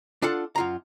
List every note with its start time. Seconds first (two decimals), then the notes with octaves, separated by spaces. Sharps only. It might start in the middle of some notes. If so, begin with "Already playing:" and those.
0.22 D4 F4 A4 F#5
0.56 F#2 F4 A#5